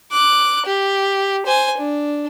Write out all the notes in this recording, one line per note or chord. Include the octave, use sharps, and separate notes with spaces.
D6 F#6
G4
C5 G#5
D4